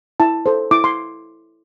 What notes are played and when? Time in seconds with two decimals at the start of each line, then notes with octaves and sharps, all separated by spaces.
0.20 E4 A5
0.46 A4 C5
0.71 E4 D6
0.84 C6